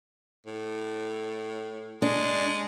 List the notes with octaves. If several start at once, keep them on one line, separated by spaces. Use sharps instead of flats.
A2
G#3 D4